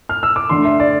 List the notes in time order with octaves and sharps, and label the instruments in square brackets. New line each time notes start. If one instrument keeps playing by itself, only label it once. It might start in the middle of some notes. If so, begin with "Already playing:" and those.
[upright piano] F6
E6
D6
D3 A3 C6
E5
D5